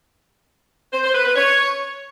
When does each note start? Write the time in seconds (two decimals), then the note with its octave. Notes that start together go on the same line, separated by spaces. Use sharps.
0.93 C5
1.04 C5
1.14 B4
1.25 B4
1.36 C#5